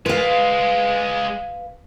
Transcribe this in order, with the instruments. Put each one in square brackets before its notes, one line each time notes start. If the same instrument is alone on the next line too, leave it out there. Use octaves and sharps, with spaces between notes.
[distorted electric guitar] G#3 F4 [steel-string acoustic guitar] B4 F5